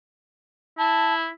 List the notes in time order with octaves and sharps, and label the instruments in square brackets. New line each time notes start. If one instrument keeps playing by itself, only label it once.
[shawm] E4 [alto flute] A5